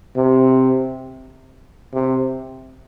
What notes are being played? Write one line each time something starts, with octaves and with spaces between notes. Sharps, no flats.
C3
C3